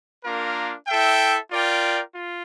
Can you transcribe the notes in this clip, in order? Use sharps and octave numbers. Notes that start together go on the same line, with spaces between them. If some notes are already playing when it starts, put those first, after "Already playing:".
A#3 D4 F4 A#4
E4 A4 E5 G5
F4 A#4 D5 G5
F4